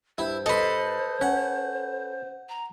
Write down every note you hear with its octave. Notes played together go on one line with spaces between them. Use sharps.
G2 E4 C5
A4 B4 D#5 C6
C#4 F#5
A#5